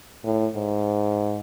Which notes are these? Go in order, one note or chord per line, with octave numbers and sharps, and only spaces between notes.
A2
G#2